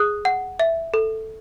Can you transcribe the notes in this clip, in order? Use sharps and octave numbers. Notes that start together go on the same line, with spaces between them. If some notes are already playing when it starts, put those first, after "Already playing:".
Already playing: G#4 D#6 F#6
F#5
E5
A4